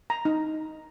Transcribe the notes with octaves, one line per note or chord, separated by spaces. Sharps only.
A#5
D#4